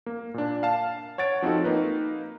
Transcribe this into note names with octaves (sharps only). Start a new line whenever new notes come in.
A#3
A#2 D4
F5 A5
C#5 F#5 A6 D7
F3 C4 D#4 F#4 A4
A#3 D#4 B4